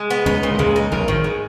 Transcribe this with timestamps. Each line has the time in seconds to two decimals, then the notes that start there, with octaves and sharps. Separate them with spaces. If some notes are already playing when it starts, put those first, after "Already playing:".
Already playing: G#3
0.10 B3
0.26 C#2 C#3 D#4
0.43 A#2
0.55 B2
0.59 C#2 C#3 G#3
0.76 D#4
0.92 B1 B2 A#4
1.08 G#1 G#2 D#3
1.24 G#3